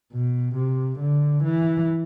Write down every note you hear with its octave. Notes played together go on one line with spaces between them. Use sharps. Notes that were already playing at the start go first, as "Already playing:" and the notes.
B2
C3
D3
E3